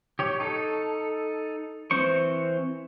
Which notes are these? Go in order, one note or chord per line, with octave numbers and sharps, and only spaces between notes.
G4 C#5
D#4 A4
E3 C4 C5 C#6